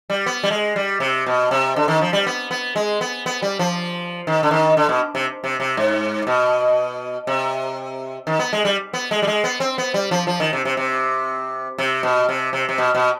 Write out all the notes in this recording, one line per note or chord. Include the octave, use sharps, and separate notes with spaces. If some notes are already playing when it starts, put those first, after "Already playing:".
G3
B3
G3
G#3
G3
C3
B2
C3
D3
D#3
F3
G3
B3
B3
G#3
B3
B3
G3
F3
D#3
D3
D#3
D3
B2
C3
C3
C3
G#2
B2
C3
D#3
B3
G#3
G3
B3
G#3
G3
G#3
B3
C4
B3
G3
F3
F3
D#3
C3
C3
C3
C3
B2
C3
C3
C3
B2
B2